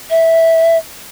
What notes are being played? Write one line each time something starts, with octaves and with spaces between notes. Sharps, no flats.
E5